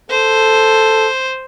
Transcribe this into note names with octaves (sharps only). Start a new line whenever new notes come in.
A4 C5